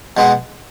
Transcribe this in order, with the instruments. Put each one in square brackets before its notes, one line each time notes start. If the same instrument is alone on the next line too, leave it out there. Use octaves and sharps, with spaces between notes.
[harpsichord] B2 G#3 B3